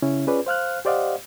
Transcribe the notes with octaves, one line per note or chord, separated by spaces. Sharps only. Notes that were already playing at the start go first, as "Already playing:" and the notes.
C#3 C#4 E4
C#4 F4 G#4 B4 D5
C5 F5 F6 F#6
G4 C5 D5 D#5 F5 F#5